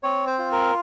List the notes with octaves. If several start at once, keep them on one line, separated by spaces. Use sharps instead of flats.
C4 C#5
C5
F4
A#4